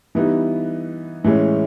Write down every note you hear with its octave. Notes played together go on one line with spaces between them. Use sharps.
E3 G3 B3 D#4
A2 E3 G#3 C#4